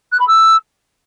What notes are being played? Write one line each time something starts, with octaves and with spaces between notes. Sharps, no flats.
F#6
B5
E6